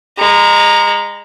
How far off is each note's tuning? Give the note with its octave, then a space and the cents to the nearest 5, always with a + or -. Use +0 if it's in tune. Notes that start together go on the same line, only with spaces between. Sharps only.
G#3 -30 A#5 +5